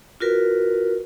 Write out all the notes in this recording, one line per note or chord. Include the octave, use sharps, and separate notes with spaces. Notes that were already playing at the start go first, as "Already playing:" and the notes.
F4 F#4 A#4 B4